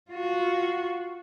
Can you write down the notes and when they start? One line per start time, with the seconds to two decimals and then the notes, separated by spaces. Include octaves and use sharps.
0.11 F4 F#4